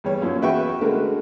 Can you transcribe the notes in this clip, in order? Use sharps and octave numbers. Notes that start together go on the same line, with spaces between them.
E2 G3 C#5
F#2 A#2 F3
E2 F#4 B4 E5 G5 C#6
D3 G#3 A3 F#4 A#4 B4